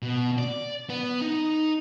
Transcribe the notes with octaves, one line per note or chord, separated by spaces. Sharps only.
B2
D5
B3
D#4